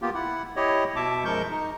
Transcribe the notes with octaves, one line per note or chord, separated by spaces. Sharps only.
A#3 B3 F4 G4
E4 F#5
E4 G4 C#5 D#5
B2 E5 A5 D6
F#2 F3 G#3 A#4 C#6 G6
D#4